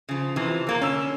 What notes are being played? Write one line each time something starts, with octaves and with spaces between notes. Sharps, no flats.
C#3 F3
C3 E3 F3
F2 A#3 A#5
D3 C#4 E6 E7